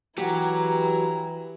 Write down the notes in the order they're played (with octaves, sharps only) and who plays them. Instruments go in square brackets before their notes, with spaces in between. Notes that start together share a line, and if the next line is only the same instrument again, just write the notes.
[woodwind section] E3 [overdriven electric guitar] F#3 [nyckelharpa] E4 A#5 [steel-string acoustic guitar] G4